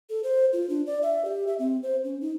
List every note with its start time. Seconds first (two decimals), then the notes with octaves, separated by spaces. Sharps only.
0.10 A4
0.24 C5
0.53 F4
0.69 D4
0.86 D5
1.03 E5
1.25 G4
1.47 E5
1.59 C4
1.83 C5
2.04 C#4
2.21 D#4